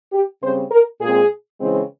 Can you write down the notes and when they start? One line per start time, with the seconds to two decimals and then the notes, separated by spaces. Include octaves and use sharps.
0.12 G4
0.42 C#3 G3 C4 C5
0.71 A#4
1.01 A#2 G#3 C4 G#4
1.60 C#3 E3 G#3 C4